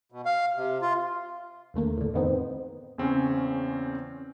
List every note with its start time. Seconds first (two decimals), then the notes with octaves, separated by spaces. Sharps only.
0.12 B2
0.26 F5
0.56 C3
0.82 F4
1.74 D#2 D3 A3 A#3
1.98 A2 D3
2.13 F2 A2 D#3 B3 C4 D#4
2.98 E2 C#3 C4 C#4